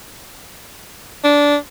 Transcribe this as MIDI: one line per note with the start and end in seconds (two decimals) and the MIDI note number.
1.24 1.56 62